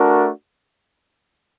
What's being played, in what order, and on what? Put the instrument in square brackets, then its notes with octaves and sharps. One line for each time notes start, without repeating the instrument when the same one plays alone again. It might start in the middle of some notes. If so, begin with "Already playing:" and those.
Already playing: [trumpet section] A3 D4 F#4 A#4